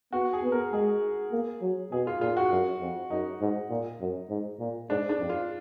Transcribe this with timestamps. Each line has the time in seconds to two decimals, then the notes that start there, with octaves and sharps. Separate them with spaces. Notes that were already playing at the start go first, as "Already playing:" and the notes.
0.12 B3 F#4
0.33 G#4
0.43 B3
0.52 A#4
0.72 G#3 G#4
1.32 A#3
1.62 F#3
1.92 B2 G#4
2.07 F4
2.21 A#2 F4
2.37 F#4
2.51 F#2
2.81 F2
3.10 F#2 D#4
3.41 G#2
3.70 A#2
4.00 F#2
4.30 G#2
4.59 A#2
4.89 G#2 D4
5.09 D4
5.20 F2
5.30 F4